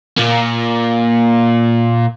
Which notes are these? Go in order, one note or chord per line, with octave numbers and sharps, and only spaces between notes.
A#2 A#3